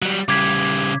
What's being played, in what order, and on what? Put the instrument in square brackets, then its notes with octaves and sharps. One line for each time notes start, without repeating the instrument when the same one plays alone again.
[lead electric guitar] F#3 G3
[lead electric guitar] C#3 G3 [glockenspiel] D6 G#6 B6